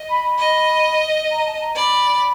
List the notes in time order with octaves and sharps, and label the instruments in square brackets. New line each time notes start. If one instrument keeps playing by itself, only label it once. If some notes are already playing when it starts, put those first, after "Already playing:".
Already playing: [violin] D#5
[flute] B5
B5
[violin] D#5
[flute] A#5
A5
A#5
[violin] D5 [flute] B5